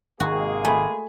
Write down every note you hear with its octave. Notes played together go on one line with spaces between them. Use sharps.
G#1 C3 D#3 G#3 A#3 F#4 G#4
A3 G#5 B5